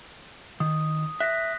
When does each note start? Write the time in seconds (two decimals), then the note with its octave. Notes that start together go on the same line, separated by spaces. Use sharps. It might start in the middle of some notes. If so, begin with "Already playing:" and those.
0.60 D#3 D#6
1.20 E5 F#6 A#6 B6